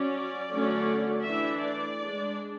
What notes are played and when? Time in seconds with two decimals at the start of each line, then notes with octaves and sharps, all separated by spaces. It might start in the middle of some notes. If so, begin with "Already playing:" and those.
Already playing: F#3 C#4 D5
0.51 D3 F#3 A3 C#4
1.24 E3 A3 D4 E5
1.62 D5
1.98 G#3 D4